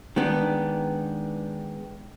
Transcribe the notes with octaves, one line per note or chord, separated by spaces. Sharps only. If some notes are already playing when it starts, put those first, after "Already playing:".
D#3 G#3 B3 D4